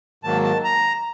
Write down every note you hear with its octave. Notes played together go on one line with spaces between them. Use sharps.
G#2 D#3 F#3 A#3 A5
A5
A#5